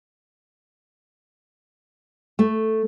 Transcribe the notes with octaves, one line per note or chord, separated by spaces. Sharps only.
A3